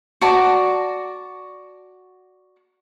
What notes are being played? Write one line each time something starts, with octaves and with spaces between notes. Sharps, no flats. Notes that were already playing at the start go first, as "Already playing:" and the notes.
F#4 D5 A5 A#5